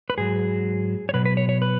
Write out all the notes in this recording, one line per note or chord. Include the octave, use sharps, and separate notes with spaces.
B4
G#2 F#3 G#4
C#5
B2 F#3 B4
B4
C#5
C#5
B4